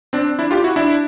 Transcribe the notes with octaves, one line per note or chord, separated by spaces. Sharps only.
C4 D4
D4 E4
F4 G4
E4 F#4
D4 E4